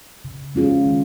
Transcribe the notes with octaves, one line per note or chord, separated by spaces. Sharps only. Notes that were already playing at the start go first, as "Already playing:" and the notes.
C#3
G#3 C#4 F4 G#4
D#3